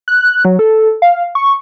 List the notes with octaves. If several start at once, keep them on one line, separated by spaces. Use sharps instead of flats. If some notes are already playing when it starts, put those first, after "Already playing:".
F#6
F#3
A4
F5
C#6